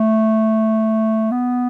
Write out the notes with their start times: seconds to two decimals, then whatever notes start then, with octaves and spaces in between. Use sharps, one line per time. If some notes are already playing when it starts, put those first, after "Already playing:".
Already playing: A3
1.32 B3